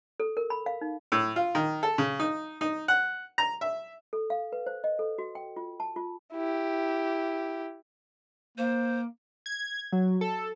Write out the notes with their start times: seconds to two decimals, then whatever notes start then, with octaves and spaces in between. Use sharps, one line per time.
0.20 A4
0.37 A#4
0.50 B5
0.66 F5
0.81 D#4
1.12 A2
1.36 F4
1.55 D#3
1.83 A4
1.98 C#3
2.20 D#4
2.61 D#4
2.88 F#5
3.38 A#5
3.61 E5
4.13 A4
4.30 F5
4.52 B4
4.66 C5
4.84 D#5
4.99 A4
5.18 F#4
5.35 G5
5.56 F4
5.80 A5
5.96 F4
6.33 E4 G4
8.57 A#3 C5
9.46 G#6
9.92 F#3
10.21 A4